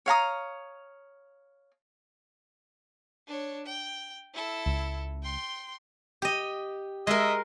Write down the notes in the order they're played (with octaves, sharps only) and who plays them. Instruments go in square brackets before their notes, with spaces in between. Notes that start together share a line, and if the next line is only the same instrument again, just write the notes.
[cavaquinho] C#5 F5 A#5 D#6
[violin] D4 C#5
G5
E4 A4
[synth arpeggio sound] C#2
[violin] G5 C6
[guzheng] G4 D#5
[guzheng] G#3 A#4 [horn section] D#5 E5